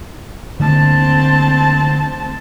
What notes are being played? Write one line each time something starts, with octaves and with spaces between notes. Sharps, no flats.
D3 A3 A#3 C4 A5